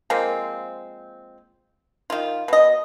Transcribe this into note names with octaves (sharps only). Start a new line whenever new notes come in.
F3 G#3 A#3 C4
D#3 F4
B2 D#5